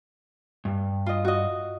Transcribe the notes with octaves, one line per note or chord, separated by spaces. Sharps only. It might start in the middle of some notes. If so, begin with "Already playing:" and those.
G2
F4 D#5
F#4 D#5